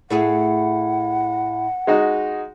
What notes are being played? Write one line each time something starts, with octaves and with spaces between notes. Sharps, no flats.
A2 E4 G#4 F#5
G#3 D#4 F#4